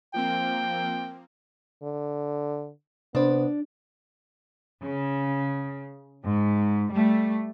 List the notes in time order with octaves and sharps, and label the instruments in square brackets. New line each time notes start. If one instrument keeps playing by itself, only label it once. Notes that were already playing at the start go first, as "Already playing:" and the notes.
[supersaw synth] F3 A#3 C4 [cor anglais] G5
[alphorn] D3
[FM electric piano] C3 C5 [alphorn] B3 [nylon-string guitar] D4
[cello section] C#3
G#2
G3 A3